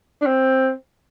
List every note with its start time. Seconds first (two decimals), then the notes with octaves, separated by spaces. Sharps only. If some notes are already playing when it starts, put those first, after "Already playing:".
0.22 D4
0.26 C4